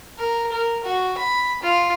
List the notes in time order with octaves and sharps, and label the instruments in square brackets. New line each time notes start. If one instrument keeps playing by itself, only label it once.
[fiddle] A#4
A#4
F#4
B5
F4